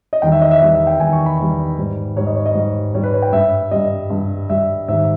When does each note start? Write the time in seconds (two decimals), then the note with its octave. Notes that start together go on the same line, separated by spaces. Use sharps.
0.13 D#5
0.22 E2 D#3 G3 G5
0.32 E5
0.41 D#5
0.51 E5
0.61 E2 D#3 G3 E5
0.75 E5
0.87 G5
1.00 E2 D#3 G3 G#5
1.13 C#6
1.26 B5
1.38 E2 D#3 G3
1.78 G#2 G3
2.16 G#2 G3 C#5
2.26 D#5
2.36 C#5
2.46 D#5
2.55 G#2 G3
2.94 G#2 G3 C#5
3.03 B4
3.14 C#5
3.22 G5
3.32 G2 G3 E5
3.71 G2 G3 D#5
4.10 G2 G3
4.49 G2 G3 E5
4.88 G#2 D#3 G3 E5